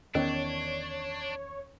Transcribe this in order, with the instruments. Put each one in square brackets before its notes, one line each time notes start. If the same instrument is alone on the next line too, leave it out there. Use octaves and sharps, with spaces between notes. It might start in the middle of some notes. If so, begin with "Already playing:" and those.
[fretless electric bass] E2 D#3 B3 [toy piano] C#4 A#4 D#5 [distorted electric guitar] D4 [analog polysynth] C#5